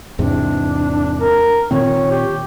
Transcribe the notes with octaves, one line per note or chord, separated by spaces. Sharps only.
E2 G#2 C3 D4
A#4
A#2 D#3 C4 C#5
G4